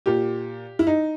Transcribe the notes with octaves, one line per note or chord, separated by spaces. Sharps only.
A#2 G4
E4
D#4